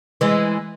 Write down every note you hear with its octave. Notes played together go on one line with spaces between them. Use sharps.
E3 G#3